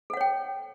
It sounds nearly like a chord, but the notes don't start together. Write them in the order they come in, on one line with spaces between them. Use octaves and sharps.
A4 F#5 C#5 G5